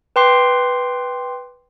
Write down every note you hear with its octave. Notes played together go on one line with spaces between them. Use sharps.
B4 G5 C6 D6 C7